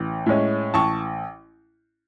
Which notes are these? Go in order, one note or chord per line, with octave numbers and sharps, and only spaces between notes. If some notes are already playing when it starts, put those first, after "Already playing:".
Already playing: A1
A2 G#3 C#4
A1 A5 C#6